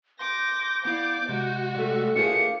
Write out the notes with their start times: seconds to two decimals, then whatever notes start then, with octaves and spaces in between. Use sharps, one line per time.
0.19 C6 D6 G6 A#6
0.85 B3 E4 D5 F5 D6
1.29 C3 G#3 F#4
1.75 G3 A3
2.16 A3 D4 F4 G#4 A#4 C5 C#7